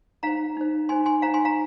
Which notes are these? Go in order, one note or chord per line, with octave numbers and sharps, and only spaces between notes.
D#4 C5 F5 A#5
D#4 C5
D#4 C5 G#5 C6
G#5 C6
D#4 C5 F5 A#5
G#5 C6
F5 A#5